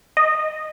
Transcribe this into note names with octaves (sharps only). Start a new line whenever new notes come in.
D#5